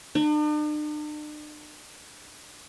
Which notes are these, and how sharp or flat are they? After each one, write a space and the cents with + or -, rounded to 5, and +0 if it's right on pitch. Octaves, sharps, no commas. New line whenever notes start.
D4 +45